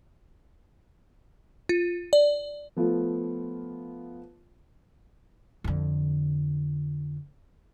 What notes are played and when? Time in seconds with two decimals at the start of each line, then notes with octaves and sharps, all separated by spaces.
1.69 F4
2.13 D5
2.76 F3 A3 B3 F4
5.64 F2 D3